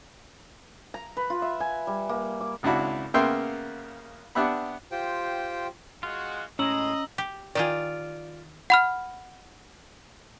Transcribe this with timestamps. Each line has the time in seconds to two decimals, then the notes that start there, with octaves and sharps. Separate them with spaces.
0.94 A#5
1.17 B4
1.30 F4
1.42 E5
1.60 G#5
1.87 G3
2.09 A#3
2.41 D6
2.63 G#1 C#2 D4 E4 F#4 B5
3.14 C#3 A#3 B3 E5 G5 C6
4.35 B3 D4 G4 E5 F#5 B5
4.91 F4 G4 C5 G5
6.03 G#3 F4 F#4
6.59 A2 G#3 C#4 D#5 A#5 E6 F#7
7.18 G4
7.55 D#3 F4 G4 G#4 D5
8.70 F#5 B5 F6